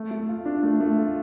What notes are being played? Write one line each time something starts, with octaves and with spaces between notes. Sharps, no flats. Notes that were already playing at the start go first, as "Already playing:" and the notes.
Already playing: A3
A3
F4
D4
A3
A3
F4